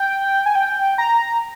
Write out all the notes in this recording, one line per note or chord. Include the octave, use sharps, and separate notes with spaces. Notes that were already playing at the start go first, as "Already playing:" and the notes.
Already playing: G5
G#5
G5
A#5